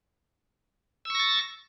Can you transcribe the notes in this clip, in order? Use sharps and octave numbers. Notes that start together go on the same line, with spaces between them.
C#6 E6 A6 A#6